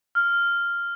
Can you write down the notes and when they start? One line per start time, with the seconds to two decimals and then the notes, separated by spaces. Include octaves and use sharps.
0.15 F6